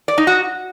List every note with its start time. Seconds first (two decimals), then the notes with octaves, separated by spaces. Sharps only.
0.08 D5
0.18 D#4
0.27 F#4